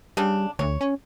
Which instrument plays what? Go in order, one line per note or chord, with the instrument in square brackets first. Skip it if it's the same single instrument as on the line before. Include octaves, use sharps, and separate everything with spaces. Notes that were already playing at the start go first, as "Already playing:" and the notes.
[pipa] C#3 D4 [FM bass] G3
[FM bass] D2 [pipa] C#5
[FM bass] C#4